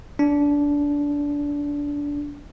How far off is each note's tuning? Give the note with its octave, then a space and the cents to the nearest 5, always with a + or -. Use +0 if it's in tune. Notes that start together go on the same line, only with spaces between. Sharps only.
D4 -20